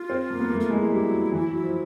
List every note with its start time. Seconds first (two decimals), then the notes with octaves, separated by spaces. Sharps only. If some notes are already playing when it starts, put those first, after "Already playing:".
Already playing: F4
0.10 C4
0.30 A#3
0.40 B3
0.50 A#3
0.55 A3
0.60 F4
0.70 G#3 E4
0.84 G#3
0.92 G3
1.02 F#3
1.32 E3
1.47 F#3
1.63 F3